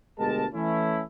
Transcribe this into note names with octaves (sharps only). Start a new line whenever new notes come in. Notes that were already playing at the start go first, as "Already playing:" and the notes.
D2 B2 G#3 G4 A#4 A5
E3 A3 C#4 E4